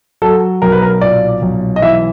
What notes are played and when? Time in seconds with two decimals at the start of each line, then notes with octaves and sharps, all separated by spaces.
0.22 F#3 A4
0.62 B1 A#4
0.72 B4
0.82 A#4
1.01 A#2 D5
1.42 B1
1.76 D#5
1.82 E3 E5